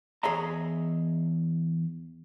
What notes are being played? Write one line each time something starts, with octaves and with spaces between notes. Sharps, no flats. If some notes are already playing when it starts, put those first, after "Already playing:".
E2 G#4 C#5 D#5 E5 A#5